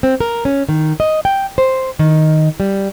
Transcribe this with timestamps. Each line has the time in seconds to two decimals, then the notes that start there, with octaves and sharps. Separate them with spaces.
0.03 C4
0.20 A#4
0.45 C#4
0.69 D#3
1.00 D#5
1.25 G5
1.58 C5
1.99 D#3
2.60 G3